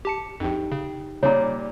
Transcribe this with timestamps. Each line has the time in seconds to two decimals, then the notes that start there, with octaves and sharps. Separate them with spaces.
0.05 G4 A5 C#7
0.40 A#1 F2 D#4 G4 G5
0.72 C#3
1.23 A#2 C#3 G3 C#5 A#5